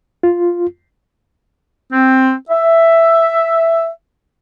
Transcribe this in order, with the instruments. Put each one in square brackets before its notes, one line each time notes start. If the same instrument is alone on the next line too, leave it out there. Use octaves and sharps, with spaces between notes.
[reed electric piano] F4
[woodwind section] C4
E5